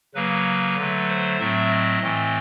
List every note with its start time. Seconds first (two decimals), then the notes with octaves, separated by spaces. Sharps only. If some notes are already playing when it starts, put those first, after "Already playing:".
0.15 C#3 F#3 A#3 B4
0.77 D3 F#3 A3
1.08 C5
1.39 A2 F#3 A3 C4 E5
1.71 D#5
2.02 A2 E3 A3 C4